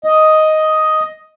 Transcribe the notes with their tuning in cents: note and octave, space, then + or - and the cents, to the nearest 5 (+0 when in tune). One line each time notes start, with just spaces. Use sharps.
D#5 +5